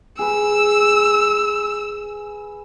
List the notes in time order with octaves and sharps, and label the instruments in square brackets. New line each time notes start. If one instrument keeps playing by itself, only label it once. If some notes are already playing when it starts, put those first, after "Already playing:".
[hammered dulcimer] G#4 B4 [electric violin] E6